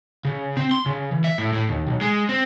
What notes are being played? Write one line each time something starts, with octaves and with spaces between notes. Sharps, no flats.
C#3
C4
C6
C#3
E3
E5
A2
A2
D#2
B1
G#3
C4